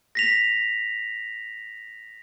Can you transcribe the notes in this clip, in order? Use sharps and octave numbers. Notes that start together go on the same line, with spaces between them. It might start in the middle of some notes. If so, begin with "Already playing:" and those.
A#6 B6 F7